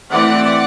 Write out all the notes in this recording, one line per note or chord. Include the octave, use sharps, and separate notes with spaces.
E3 A3 C4 D5 F#5